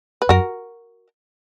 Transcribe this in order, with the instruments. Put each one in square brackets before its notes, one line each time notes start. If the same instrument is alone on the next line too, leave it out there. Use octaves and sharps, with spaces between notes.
[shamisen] B4
[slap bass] F#2 [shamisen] F#4 A#4